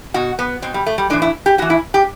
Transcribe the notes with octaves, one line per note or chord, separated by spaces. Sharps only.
B2 F#4
B3
B2 C4
G3
A3
G3
A2 E3 D4
E4
G4
A2 E3 F#4
E4
G4